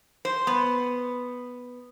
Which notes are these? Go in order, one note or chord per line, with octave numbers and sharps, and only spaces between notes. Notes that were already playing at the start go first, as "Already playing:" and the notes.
C5
B3